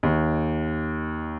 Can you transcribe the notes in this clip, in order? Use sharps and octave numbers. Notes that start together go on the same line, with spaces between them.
D#2